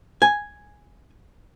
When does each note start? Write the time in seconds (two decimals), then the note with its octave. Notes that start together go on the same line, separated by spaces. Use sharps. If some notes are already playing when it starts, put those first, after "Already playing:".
0.22 G#5